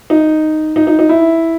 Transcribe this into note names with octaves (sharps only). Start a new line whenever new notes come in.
D#4
D#4
D#4
D#4
E4